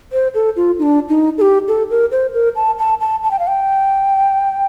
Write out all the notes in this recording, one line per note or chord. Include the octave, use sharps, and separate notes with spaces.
C5
A4
F4
D#4
D4
D#4
A4
G4
A4
A#4
C5
A#4
A5
A5
A5
A5
G5
F5
G5